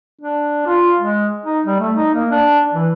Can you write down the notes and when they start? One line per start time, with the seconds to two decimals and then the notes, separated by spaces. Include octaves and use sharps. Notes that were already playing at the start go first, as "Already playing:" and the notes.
0.21 D4
0.67 F4
0.99 G#3
1.46 D#4
1.66 G3
1.80 A3
1.96 D#4
2.15 A#3
2.31 D4
2.73 E3